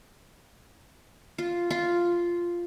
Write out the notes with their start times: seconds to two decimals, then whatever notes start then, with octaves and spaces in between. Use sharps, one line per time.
1.38 F4
1.71 F4